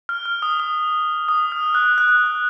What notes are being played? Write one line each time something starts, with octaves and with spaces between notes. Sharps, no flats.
F6
F6
D#6
D#6
D#6
F6
F#6
F#6